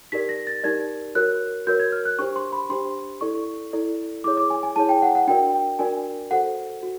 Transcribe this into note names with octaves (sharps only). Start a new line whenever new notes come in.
D#4 G4 A#4 D5 B6
A#6
A6
D#4 G4 A#4 D5 G#6
F#4 A#4 C#5 F#6
F#4 A#4 C#5 G6
G#6
F6
F#6
D4 G4 C5 C#6
C6
B5
D4 G4 C5 C6
E4 A4 D5 C#6
E4 A4 D5
E4 G#4 C#5 D6
D6
G#5
G#5
E4 G#4 C#5 A5
G5
F#5
F#5
D4 F#4 A#4 D5 G5
G5
D4 F#4 A#4 D5 G#5
F#4 A4 C5 F#5
F#4